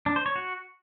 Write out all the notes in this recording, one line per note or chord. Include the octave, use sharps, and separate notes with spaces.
D4
C5
C#5
F#4